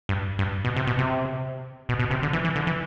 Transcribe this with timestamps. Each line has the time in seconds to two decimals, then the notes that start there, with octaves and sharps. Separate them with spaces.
0.09 G2
0.39 G2
0.65 B2
0.76 C3
0.87 B2
0.98 C3
1.89 B2
2.00 B2
2.11 C3
2.23 D3
2.33 E3
2.44 E3
2.56 D3
2.67 E3